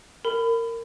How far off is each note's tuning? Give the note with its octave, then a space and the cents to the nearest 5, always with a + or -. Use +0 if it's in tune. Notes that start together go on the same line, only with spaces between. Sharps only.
A#4 -20 B5 +25